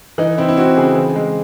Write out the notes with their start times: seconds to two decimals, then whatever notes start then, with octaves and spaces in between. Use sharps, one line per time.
0.18 E3 D#4
0.38 C4 E4
0.49 E4
0.57 C4 F#4
0.77 C#3 G#4
0.96 E3
1.16 G#3